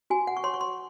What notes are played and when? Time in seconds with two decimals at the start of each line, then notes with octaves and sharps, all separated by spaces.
0.10 F#4 G#5
0.27 F#5
0.37 C#6
0.44 C#5 C6
0.54 C#6
0.61 C6